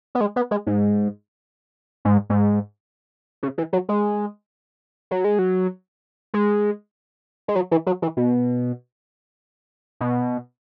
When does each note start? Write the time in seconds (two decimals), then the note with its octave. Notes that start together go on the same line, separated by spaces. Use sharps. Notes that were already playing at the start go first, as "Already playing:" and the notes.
0.15 B3
0.21 G#3
0.36 B3
0.51 G#3
0.67 G#2
2.05 G#2
2.30 G#2
3.43 C#3
3.58 E3
3.73 F#3
3.89 G#3
5.11 F#3
5.24 G#3
5.39 F#3
6.34 G#3
7.48 G#3
7.55 F#3
7.71 E3
7.86 F#3
8.02 E3
8.17 B2
10.01 B2